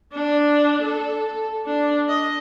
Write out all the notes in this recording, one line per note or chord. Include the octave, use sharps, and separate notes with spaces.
D4
A4
D4
D#5